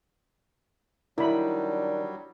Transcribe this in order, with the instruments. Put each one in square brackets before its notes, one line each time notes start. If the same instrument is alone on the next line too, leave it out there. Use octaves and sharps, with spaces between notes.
[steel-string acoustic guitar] D#3 [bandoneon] F#3 G3 [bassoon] D4 [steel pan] E4 B5